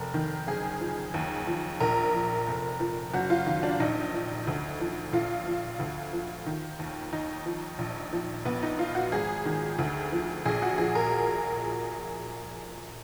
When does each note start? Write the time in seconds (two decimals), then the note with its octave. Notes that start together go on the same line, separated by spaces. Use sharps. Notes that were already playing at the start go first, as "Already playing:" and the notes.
Already playing: F1 A#4
0.14 D#3
0.47 F#1 G#4
0.80 F3
1.14 D#2
1.47 F3
1.80 A#1 A#4
2.14 F3
2.47 F1
2.80 F3
3.13 F#1 F#4
3.30 F4
3.46 D#3
3.63 D4
3.80 A#1 D#4
4.14 F3
4.47 D2
4.80 F3
5.13 A#1 F4
5.47 F3
5.79 D2
6.13 F3
6.46 D#3
6.79 D#2
7.12 D#2 D#4
7.46 F3
7.79 A#1
8.13 F3
8.45 A#1 B3
8.63 D#4
8.79 F3 F4
8.95 F#4
9.12 G#1 G#4
9.45 D#3
9.79 D2
10.13 F3
10.45 A#1 G#4
10.62 F#4
10.78 F3 G#4
10.95 A#4